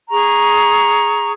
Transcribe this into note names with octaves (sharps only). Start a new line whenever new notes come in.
G#4 A#5 C#6